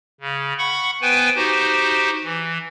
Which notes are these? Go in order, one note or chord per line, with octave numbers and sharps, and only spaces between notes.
C#3
F#5 B5 C#6
B3 B4 C5 G5 G#5
D#4 F#4 G4 C5
E3